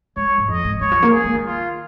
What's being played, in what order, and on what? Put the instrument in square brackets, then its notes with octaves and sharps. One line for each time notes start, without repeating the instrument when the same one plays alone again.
[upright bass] G#3 [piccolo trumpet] C#5
[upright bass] G#2
[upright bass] F2 [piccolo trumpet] D#5
[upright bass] G#2
[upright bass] D#3 [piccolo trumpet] C#5
[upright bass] F3
A#3
[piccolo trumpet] G#4
[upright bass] G#3
D#3
[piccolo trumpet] F4